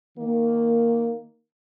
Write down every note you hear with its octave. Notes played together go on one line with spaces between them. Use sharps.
D#3 A#3